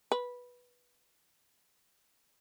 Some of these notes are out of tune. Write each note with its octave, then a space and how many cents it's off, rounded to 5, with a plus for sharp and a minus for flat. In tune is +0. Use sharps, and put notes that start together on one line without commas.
B4 -10